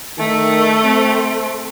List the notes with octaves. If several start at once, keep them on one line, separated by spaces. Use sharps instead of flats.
D#3 A3
C4